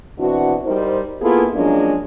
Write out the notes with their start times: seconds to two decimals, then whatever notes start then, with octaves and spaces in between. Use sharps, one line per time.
0.19 B2 E3 C4 D4 F#4
0.66 G3 D#4 A#4 C5
1.22 A#3 B3 E4 F4 G#4 A4
1.54 F3 F#3 G#3 A#3 C#4 D4